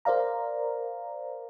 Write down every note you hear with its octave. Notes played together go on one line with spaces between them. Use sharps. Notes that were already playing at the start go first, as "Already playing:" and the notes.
A#4 C5 D5 F5 A#5